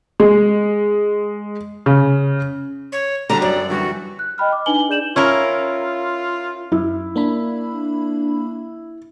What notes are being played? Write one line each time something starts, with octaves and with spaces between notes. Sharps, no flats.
G#3
C#3
C#5
D3 F#3 G3 D4 A#5
F#2 D5
D3 E3 G3 F#4
F#6
D#5 G5 B5 F6
D6
D4 D#4 B4 G#5 F#7 G7
D4 G#4 D5 G6 E7 F#7
C#4 E4 F4 A#4
F#2 E4
A#3 D4 B5